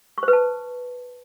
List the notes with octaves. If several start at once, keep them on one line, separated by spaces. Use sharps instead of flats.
C#6
C5
B4
A5